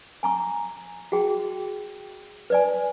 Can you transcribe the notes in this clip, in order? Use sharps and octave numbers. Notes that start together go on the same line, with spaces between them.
G#5 A#5 C#6
F#4 G#4 G5
B4 D5 G#5